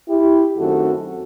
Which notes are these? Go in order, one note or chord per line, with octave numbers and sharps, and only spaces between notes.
E4 G4
F#2 D#3 A3 C4 F#4 A4